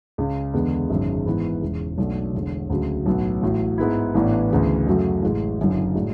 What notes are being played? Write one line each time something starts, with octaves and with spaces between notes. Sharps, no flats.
C#2 C#3 G#3
E2 D3 G#3 B3
G#1 F#2 C#3 G#3
G#2 E3 B3 E4
E1 E2 C#3
B1 B2 A3 D4
E1 E2 D3
D2 C#3 F#3
B1 A2 F#3 B3
A1 A2 F#3
G#2 G#3 B3 E4
A1 A2 E3 B3 D4
D2 C#3 E3
F#2 C#3 F#3 A3
A1 A2 G#3
F#1 F#2 D3
A2 G#3 D4 F#4